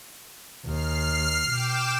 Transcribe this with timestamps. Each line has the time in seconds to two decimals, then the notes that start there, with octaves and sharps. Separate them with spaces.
0.66 D#2 F6 C7
1.49 B2 G5 D6 E7